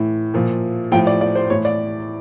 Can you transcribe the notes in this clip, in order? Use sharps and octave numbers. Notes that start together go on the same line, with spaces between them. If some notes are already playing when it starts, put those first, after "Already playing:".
Already playing: A2 E3
A#2 F3
A2 F3 G5
D5
D5
C5
A2 E3 C#5
D5